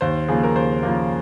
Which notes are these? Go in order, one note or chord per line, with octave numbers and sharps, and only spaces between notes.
D#2 C5
C#3 F3 A#3 G#4
A#4
D#2 C5
C#3 F3 A#3